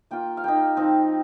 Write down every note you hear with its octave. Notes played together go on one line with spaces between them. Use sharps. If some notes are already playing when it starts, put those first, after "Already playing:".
A#3 F4 G5
F5
A#3 D#4 G5
F3 C4 D#4